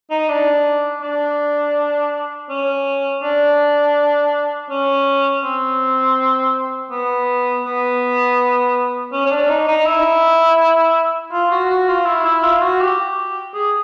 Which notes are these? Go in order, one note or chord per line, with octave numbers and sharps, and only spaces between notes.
D#4
D4
D4
C#4
D4
C#4
C4
B3
B3
C#4
C#4
D4
D#4
D#4
E4
F4
F#4
F#4
F4
E4
E4
F4
F#4
G4
G#4